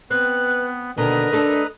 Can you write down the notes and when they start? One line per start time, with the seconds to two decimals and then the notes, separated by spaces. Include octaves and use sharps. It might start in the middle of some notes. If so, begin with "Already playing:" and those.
0.11 B3 C4 B4 F#6
0.98 D#2 B2 D3 A#4 B4 D#5 A#5
1.33 A3 D4 A4